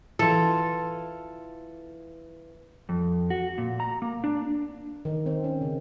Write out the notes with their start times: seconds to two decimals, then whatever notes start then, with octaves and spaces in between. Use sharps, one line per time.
0.19 E3 F4 A4
2.89 F2
3.30 F#4
3.58 A#2
3.80 A#5
4.02 A#3
4.24 D4
5.05 D#3
5.26 C4
5.44 C#4
5.61 C#3